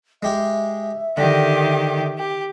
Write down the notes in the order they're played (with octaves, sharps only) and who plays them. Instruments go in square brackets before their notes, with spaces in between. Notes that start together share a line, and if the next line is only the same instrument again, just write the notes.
[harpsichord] G#3 G4 G#4 [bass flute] E5
[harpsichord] D3 [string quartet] D#3 G4
[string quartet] G4